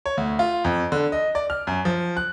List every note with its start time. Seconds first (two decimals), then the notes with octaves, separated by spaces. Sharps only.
0.06 C#5
0.17 D2
0.39 F4
0.64 F2
0.92 D3
1.12 D#5
1.35 D5
1.50 F6
1.67 F#2
1.85 F3
2.17 F#6